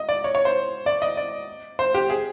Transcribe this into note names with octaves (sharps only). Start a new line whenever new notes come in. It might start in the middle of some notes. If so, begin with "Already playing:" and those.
Already playing: D#5
D5
C#5
C#5
C5
D5
D#5
D5
C5
G4
G#4